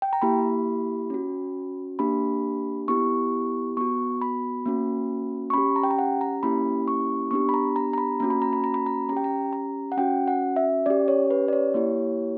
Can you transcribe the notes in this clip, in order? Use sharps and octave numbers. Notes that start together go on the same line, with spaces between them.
G5
A#5
A#3 E4 G4 B5
C#4 F#4
A#3 D4 G4 B5
B3 E4 G4 C#6
B3 F#4 C#6
B5
A#3 C#4 F#4
C#6
C#4 G4 B5
A#5
G5
A#5
F#5
A#5
A#3 C#4 E4 G4 B5
C#6
B3 D4 G4 C#6
B5
A#5
A#5
A#5
B5
A#3 C#4 F#4 A#5
B5
A#5
B5
A#5
B5
A#5
C#4 G4 G5 A#5
A#5
A#5
F#5
C#4 F#4 G5
F#5
E5
C#4 G4 D5
C#5
B4
D5
C#5
A#3 E4 G4